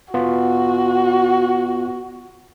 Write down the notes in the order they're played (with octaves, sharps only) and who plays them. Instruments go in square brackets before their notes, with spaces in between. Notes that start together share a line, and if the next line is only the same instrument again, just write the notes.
[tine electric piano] B3 F4 [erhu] F#4